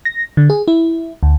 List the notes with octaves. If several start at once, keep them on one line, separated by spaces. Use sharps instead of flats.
A#6
D3
G#4
E4
D2